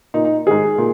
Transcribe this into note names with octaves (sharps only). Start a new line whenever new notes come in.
A#2 D#4
D#4
G#2 D#3 G#4
A#2